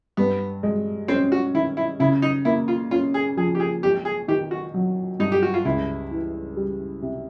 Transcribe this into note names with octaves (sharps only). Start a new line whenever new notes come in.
G2 B3
G#3
C4 C#4
F#4
D#3 E4
E4
C#3 E4
D#4
A#3 E4
F4
C#4 F4
G#4
F3 G#4
G4
G#4
G#1 G4
G#4
D#3 G4
F#4
F#3
G2 D#4
G4
F#4
F4
C#2 E4
E3
G3
C3